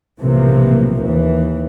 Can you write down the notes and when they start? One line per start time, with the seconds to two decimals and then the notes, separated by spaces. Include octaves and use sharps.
0.20 B1 A2 C3 E3 F3 A#3
1.04 D#2 E3